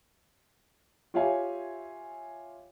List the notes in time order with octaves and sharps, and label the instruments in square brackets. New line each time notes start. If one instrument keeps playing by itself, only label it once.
[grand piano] F4 G4 C#5 E5 F5 G#5